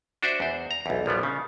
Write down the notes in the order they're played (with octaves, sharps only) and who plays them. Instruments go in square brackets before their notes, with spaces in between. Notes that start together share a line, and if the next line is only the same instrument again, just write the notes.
[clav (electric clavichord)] D4 F#4 C5 D5 E5
E2 C5
A#5
B1 E2
A#1 F3 G3 B3
C#3